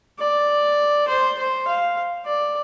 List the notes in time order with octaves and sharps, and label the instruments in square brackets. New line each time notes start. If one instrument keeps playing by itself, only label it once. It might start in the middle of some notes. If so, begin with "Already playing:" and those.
[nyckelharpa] D5
C5
C5
F5
D5